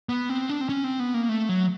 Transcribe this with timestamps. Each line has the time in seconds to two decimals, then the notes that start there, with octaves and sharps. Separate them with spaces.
0.09 B3
0.29 C4
0.49 D4
0.61 C4
0.69 C#4
0.84 C4
1.00 B3
1.14 A#3
1.29 A3
1.49 F#3